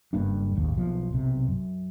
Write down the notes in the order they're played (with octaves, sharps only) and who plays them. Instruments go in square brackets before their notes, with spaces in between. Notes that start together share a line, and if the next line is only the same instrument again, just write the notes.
[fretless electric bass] F#1 G2 A#3 D4
G#1 D#2
B1 F3
B1 C3
F#2